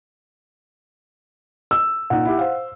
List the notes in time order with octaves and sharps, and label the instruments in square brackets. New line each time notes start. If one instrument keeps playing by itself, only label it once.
[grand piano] E6
[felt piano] A#2 D#4 [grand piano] F#5
[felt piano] E4 G4
C5 F5